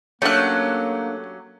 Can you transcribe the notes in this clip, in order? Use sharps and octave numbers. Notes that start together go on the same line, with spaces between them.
F#3 A3 A#3 C#4 D4 G4 C#5 F#6